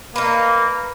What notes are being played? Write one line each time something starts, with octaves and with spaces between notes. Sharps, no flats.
A#3 D#4 B4